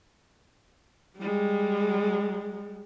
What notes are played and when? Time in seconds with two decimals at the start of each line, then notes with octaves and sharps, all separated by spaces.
1.18 G3 G#3